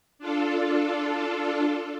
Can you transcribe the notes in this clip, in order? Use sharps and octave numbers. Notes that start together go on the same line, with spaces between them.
D4 F4 A4